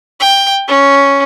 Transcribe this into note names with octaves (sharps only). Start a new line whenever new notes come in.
G5
C#4